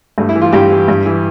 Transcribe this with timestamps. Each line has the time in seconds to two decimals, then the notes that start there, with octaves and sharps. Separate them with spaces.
0.18 G2 A3
0.29 E4
0.35 E3
0.42 F4
0.52 G2 G4
0.71 E3
0.88 G2
1.06 E3